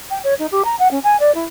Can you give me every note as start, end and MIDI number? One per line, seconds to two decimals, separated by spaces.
0.10 0.19 79
0.23 0.34 73
0.38 0.46 63
0.51 0.62 67
0.64 0.75 82
0.79 0.87 78
0.91 0.99 61
1.03 1.16 80
1.19 1.33 74
1.34 1.45 64